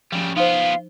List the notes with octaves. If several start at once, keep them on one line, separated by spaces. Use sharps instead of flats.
C#3 F3 G3
B3 D#4 F4 C5 F5